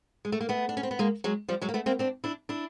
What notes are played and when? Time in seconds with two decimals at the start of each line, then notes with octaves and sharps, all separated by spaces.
0.25 G#3
0.32 A3
0.41 A#3
0.49 A3 B3
0.69 D4
0.77 C#4
0.83 C4
0.91 B3
0.99 G#3 A#3
1.24 F#3 G#3
1.48 F3 G3
1.62 F#3 G#3
1.69 A#3
1.74 A3 B3
1.86 A#3 C4
1.99 C4 D4
2.24 D4 E4
2.49 D4 E4